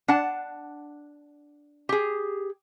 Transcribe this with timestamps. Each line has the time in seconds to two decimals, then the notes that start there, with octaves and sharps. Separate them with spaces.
0.08 D4 F#5 A5
1.89 G4 G#4